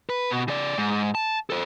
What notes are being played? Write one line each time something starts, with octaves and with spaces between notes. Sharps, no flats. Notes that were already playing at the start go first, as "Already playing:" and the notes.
B4
B2
C#3 D5
G#2
A5
A4 C5